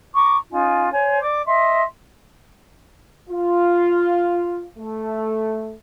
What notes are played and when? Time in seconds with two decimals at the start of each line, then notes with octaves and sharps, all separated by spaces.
0.13 A#5 C#6 D6
0.50 C#4 D#4 F4 G#5
0.92 C5 C#5 G#5
1.21 D5 D6
1.46 D#5 E5 C6
3.30 F4
4.78 A3